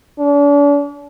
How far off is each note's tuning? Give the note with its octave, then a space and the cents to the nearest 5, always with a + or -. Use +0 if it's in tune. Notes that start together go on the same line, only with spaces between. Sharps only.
D4 -40